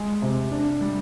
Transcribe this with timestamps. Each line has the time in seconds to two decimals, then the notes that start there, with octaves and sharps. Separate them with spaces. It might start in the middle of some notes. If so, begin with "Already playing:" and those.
Already playing: G#3
0.22 C3
0.52 D4
0.81 G3